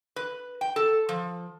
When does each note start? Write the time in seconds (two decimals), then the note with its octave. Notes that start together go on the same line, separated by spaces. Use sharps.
0.16 B4
0.61 G5
0.76 A4
1.09 F3